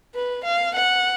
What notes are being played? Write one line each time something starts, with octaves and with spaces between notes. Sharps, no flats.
B4
F5
F#5